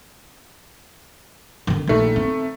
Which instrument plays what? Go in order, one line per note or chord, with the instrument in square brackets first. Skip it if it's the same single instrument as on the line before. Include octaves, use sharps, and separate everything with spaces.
[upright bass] D3 D#3
[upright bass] A#1 [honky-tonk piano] D#3 A3
[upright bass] C4